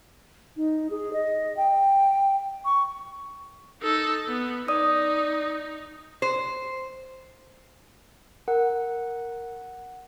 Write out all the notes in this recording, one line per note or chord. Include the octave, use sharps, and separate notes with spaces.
D#4
G#4
D#5
G5
C#6
D#4 A4
B3
D#4 D5 D#6
C5
A#4 F#5